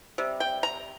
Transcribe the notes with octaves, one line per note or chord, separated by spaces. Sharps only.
C3 G3
G5
A#5